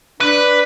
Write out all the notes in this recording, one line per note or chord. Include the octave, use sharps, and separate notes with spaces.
D4 B4